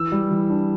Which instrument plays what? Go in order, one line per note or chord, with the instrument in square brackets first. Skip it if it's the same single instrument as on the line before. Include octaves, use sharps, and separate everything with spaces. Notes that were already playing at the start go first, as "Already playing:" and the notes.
Already playing: [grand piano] E3 E6
G3
E3
D4